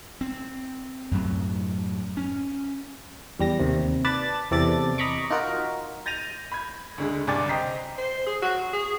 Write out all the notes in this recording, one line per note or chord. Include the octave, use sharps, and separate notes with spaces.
C4
F#2 A2 F#3
C#4
E2 G3 A#6
D#2 C3
B4 D5 A5 B5 A6
E2 C3 A4 D5 A6
D#5 A#5 B5 C#6 D6
D#4 F4 F#4 A#4
G6 A6 A#6 D#7 F7
B5 G#6
D2 D3 G#3
C2 G2 D5 G#5 D6 A6
C5 D#5 G5 A#5 B6 C7
C5
G#4
F#4
G#4